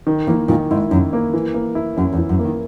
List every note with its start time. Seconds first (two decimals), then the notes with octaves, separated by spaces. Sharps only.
0.07 D#3
0.27 E3 A#3
0.48 A#2 D#3
0.71 G#2 E4
0.91 F#2 D#3
1.13 A#3
1.34 E3
1.54 A#3
1.75 E4
1.97 F#2 C#4
2.13 E2
2.18 E3
2.29 F#2
2.39 A#3
2.44 D#3